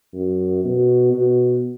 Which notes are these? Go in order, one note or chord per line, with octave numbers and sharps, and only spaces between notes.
F#2
B2
B2